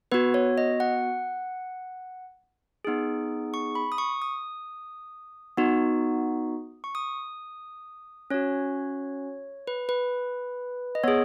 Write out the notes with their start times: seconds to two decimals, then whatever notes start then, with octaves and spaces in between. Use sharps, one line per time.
0.12 B3 F#4 B4
0.34 C#5
0.58 D#5
0.80 F#5
2.85 B3 D#4 G#4
3.54 C#6
3.75 B5
3.92 D#6
3.98 C#6
4.22 D#6
5.57 B3 D#4 F#4
6.84 C#6
6.95 D#6
8.30 C#4 F#4 C#5
9.67 B4
9.89 B4
10.95 D#5
11.04 B3 G#4 C#5